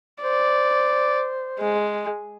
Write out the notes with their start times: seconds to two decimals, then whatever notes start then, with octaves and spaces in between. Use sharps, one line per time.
0.23 C5 D5
1.60 G#3